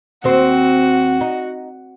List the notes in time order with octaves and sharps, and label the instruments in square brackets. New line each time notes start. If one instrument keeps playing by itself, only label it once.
[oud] D#2 C4 C5 [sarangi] F#4
[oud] D#4